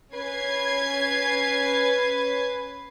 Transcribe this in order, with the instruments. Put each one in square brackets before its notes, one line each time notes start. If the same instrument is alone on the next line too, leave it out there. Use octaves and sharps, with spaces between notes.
[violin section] C#4 G#6 C7 [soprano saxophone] B4